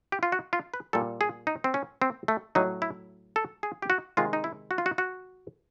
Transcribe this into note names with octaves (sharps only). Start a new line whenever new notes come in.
G4
F4
F#4
F4
B4
A#2 G3 A4
G#4
D#4
C4
C#4
C4
A3
A2 F#3 D#4
E4
A4
G#4
G4
F#4
C3 D#3 G#3 F4
D#4
E4
F#4
F4
F#4
F#4